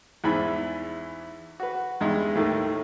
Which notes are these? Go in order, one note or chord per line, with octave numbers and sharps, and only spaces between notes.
E2 G#2 E3 E5 G#5 B5
F#4 B4
E2 G2 G#3 D#4
D#2 A2 D#3 A3